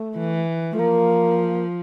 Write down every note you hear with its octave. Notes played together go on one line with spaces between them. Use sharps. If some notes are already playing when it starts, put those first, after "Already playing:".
Already playing: A3
E3
A3
F3 A#3